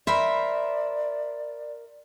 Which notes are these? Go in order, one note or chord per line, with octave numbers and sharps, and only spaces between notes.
A#4 C5 D5 E5 B5